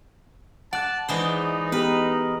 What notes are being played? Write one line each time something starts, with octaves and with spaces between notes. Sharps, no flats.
D5 F#5 A5 F#6
E3 G#3 D#4 G#4 C5 D5 B5
B3 G4 A#4 B4 D#5